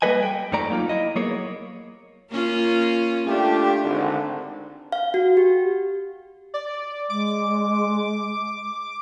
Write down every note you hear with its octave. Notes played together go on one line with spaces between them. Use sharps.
G3 A#3 A4 B4 D#5 G#5
G5
F2 D#3 F3 A3 D5 A#5
F#3 A#3 D#4 F4
E4 D#5
F#3 A#3 B3 G#4 A#4 C#5
A#3 C#4 F4
A3 D4 F4 G4
G#1 D3
F5
F#4
G4
D5
G#3 D6